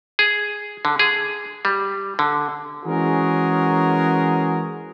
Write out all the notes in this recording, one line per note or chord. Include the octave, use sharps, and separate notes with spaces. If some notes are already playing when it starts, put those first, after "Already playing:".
G#4
D3
G#4
G3
D3
E3 G#3 C#4 F#4 G#4 A#4